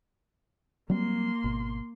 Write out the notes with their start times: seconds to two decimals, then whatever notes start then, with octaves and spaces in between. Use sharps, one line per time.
0.90 F#3 G3 A#3 C4 C6
1.44 G#1 B2